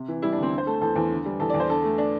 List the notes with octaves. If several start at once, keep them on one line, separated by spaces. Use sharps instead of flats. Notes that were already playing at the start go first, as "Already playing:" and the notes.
Already playing: C3
E3
G3 E4
D4
D2
C4
D3
C5
A3 A4
E2 A4
E2
D3
G3
E2 A4
D5
E2
C5
D3 A4
A3
D4